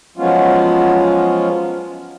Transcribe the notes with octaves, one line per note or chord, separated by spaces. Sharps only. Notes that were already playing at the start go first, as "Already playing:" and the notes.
F3 F#3 G#3 B3 C#4 F4